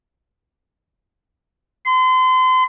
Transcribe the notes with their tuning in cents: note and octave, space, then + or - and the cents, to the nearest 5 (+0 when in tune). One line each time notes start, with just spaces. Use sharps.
C6 -35